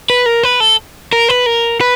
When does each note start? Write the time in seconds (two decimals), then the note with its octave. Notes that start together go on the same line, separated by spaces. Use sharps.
0.10 B4
0.26 A#4
0.44 B4
0.60 A4
1.13 A#4
1.29 B4
1.46 A#4
1.81 B4